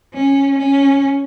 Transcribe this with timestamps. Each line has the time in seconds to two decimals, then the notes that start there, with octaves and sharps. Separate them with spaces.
0.14 C#4
0.58 C#4